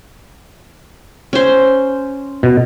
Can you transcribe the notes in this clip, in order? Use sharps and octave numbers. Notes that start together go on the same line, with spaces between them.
C#4 C5
B2